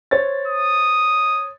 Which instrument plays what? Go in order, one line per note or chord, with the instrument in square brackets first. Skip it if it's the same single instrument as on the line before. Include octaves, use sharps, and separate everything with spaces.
[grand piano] C5 C#5 A6
[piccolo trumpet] D#6